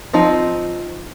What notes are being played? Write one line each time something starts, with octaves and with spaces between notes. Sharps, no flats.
F3 C4 D#4